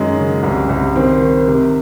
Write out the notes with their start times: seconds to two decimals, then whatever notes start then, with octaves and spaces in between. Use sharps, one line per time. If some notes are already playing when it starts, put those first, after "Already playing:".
Already playing: F#2 D#3 G#3
0.17 C#3
0.43 C2
0.69 C2
0.95 D#3 C4
1.22 D#3
1.48 C3